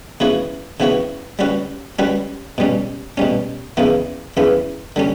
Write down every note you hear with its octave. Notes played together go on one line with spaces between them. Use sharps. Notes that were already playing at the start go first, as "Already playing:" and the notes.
C#3 E3 B3 F#4 C#5
C#3 E3 B3 F#4 C#5
G3 C#4 F#4 B4
G3 C#4 F#4 B4
B2 G3 C#4
B2 G3 C#4
E2 C#3 E3 B3
E2 C#3 E3 B3
D3 G3 C#4